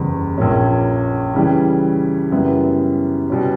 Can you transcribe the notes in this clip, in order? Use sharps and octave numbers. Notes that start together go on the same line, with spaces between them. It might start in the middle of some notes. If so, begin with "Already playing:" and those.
Already playing: F#1 E2 C#3 G3 B3
A#1 A#2 A#3 C#4
C#3 E3 G3
F#2 C#3 G3 B3 E4
B2 G3 C#4 G4